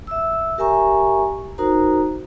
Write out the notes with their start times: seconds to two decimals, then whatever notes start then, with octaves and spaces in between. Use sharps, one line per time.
0.07 E5 E6
0.58 G4 A#4 E5 G#5 A#5 C#6
1.58 D#4 F#4 A#4 C5 A#5